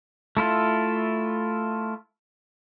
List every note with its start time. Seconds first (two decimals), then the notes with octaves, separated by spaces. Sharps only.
0.37 A3 E4 F4 A4